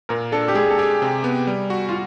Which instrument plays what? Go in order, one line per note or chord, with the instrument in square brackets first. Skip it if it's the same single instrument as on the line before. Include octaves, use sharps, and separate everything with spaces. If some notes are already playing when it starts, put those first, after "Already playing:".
[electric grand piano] A#2 [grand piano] A#4
[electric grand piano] D4 [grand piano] A4
[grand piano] G4
[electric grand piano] G#3 [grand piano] G#4
[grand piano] A4
[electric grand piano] G4 [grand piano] G#4
[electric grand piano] C3
B3
G3
F#4
[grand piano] F4